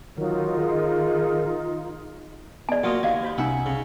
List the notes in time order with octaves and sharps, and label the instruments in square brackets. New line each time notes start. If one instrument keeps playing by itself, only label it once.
[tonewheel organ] D#3 A#4 [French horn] F#3 [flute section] D#4 F4
[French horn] G#4
[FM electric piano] B3 G#4 [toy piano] D5 G#5
[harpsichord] F#3 F4 D#5 [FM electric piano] A#3
[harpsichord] D#2 [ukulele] F#4 D#5 F5 [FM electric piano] G#6
[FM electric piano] C5 B5 G6
[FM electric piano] C2 [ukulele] C#4 D#4 [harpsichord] E5 F#5
[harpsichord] C#3